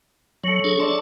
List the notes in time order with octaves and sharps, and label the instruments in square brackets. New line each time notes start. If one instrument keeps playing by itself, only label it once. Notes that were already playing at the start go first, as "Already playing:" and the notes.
[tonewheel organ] F#3 [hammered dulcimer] A4 C#5
[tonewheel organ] D4 G#4
[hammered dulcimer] D5 E5 C6 [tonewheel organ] A5